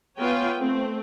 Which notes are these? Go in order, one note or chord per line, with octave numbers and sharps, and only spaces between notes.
B3 F4 B4 C#5 G5 G#5
A3 C4